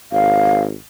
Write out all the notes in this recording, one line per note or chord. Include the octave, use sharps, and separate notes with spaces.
G#1 F5